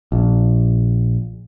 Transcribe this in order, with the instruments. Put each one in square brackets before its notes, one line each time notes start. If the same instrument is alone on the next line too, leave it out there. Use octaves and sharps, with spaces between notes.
[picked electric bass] A#1